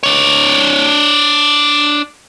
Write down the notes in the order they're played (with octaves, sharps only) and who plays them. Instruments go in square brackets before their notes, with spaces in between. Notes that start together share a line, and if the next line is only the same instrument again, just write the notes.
[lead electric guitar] D4 C#5